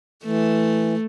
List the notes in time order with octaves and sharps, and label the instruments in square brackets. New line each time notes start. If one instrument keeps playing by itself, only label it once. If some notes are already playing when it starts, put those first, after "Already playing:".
[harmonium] E3 [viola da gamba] A3